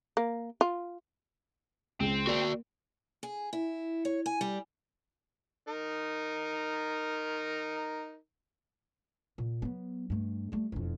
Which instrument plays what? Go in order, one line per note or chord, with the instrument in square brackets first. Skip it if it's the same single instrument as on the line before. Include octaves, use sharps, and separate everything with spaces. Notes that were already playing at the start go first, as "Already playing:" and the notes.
[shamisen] A#3
F4
[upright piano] C#2 [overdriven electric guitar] C4
[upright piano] A#3 [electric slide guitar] F#4 D5
[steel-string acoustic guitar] G#4
E4
C#5
G#5
G3
[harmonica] D#4 A#4
[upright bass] A#2
F#3 B3
G2 A3
G3 A3
E1 F2